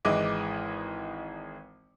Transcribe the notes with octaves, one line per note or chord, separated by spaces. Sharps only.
G#1 E3 G#3 E4 D#5 D6